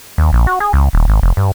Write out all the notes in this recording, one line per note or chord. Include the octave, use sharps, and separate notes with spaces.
D#2
A#1
F#4
G#4
C#2
D#1
G#1
F1
G2